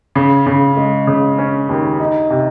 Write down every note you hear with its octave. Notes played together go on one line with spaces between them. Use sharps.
C#3
C#3
G#3
C#3
C#4
D#2
D#4
C3